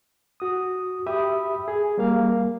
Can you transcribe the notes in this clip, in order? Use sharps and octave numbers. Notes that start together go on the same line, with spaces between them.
F#4 D#6
G4 E5 B5 D#6
G#4
G3 A#3 F5